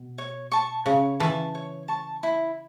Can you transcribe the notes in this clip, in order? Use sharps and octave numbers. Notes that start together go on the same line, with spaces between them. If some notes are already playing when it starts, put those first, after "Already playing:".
Already playing: B2
C#5
A5 C#6
C#3 C#5
E3 A5 C#6
C#5
A5 C#6
E4